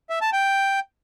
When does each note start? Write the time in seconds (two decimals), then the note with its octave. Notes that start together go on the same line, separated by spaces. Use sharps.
0.10 E5
0.21 A5
0.33 G5